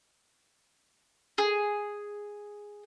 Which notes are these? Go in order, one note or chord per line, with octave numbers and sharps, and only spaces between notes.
G#4